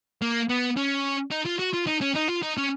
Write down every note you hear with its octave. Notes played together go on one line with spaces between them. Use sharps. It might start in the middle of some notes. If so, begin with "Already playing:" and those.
A#3
B3
C#4
D#4
F4
F#4
F4
D#4
C#4
D#4
F4
D#4
C#4